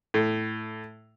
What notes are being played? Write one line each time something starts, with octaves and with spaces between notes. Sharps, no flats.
A2